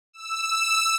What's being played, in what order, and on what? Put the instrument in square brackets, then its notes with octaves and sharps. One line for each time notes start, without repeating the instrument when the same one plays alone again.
[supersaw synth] E6